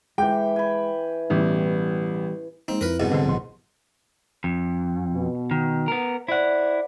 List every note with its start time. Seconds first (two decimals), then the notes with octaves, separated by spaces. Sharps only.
0.18 E3 G#3 G4 G5
0.56 G#5 B5
1.30 A1 B2 E3 G3
2.68 G#3 A#3 C4 D#4
2.81 F2 E4 A#4 B4
3.00 C2 G#2 B2
3.12 D3 C4 A4 B4
3.26 A#1 C6
4.44 F2
5.13 B2
5.51 D#3
5.88 B3 A#4
6.28 E4 C5 D5 F#5